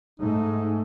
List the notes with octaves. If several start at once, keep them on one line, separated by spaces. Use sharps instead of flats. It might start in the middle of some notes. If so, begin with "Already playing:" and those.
G#2 A3 D#4